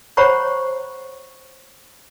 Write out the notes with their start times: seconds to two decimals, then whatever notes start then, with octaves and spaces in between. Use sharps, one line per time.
0.17 C5 C#5 F#5 A#5 B5 C#6